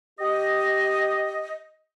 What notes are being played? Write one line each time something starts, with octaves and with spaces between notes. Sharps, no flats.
G4 D#5